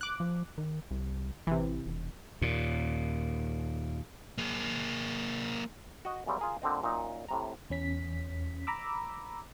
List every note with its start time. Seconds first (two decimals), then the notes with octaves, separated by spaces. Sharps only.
0.01 D6 F#6
0.20 F3
0.58 D#3
0.91 C2
1.47 A1 C3 E3
1.86 E1
2.42 D#2 A#2
4.38 A#3 G#4
6.05 F#4 D#5
6.26 F#2 C#3 G3 C4
6.39 F4 G#4 A#4
6.62 A#2 D3 C4 D#5
6.82 F#2 A#2 D#4
7.28 A2 C3 A#5
7.70 E2 C#4 B6
8.67 A#5 B5 D6 E6